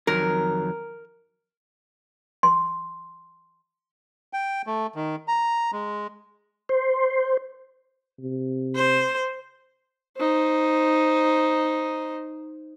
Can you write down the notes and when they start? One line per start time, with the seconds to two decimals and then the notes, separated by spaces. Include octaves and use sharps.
0.07 F2 D#3 F#3 A#4
2.43 C6
4.33 G5
4.67 A3
4.95 D#3
5.28 A#5
5.73 G#3
6.69 C5
8.19 C3
8.75 C5
10.17 D#4 C5